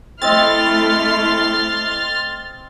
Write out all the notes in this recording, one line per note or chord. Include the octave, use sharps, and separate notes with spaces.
A3 C4 E4 D#5 C6 F6 A6